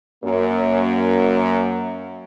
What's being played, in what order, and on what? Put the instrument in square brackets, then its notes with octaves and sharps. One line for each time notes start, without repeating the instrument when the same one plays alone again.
[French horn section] F#2 A#3